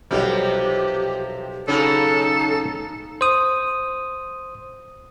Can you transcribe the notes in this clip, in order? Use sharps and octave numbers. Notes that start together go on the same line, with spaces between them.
B1 C3 F3 G3 C4 G4
C#3 F#3 C#4 D#4 A4
C5 D#6